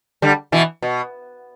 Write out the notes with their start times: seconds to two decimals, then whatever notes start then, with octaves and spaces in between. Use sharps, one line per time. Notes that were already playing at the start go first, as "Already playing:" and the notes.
0.22 D3 G3
0.52 B2 E3
0.82 B2